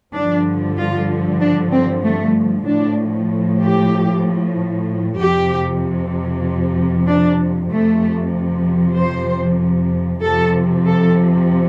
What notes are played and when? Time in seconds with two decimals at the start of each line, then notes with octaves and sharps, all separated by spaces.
0.14 G2 D3 F3 D4
0.77 F4
1.41 D4
1.72 C4
2.03 A3
2.66 A2 F3 D4
3.61 G4
5.18 F2 C3 F3 G4
7.07 D4
7.71 F2 C3 F3 A3
8.96 C5
10.22 F2 C3 F3 A4
10.86 A4